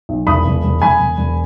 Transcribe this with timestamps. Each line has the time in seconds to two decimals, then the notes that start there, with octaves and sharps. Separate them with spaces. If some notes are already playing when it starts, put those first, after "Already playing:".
0.09 B1
0.27 E1 B5 D#6
0.46 E1
0.64 E1
0.82 E1 G#5 B5
1.00 E1
1.18 E1